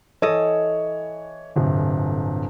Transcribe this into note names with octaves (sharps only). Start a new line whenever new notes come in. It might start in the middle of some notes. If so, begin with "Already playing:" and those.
E3 A4 C#5 D#5
D1 G1 C3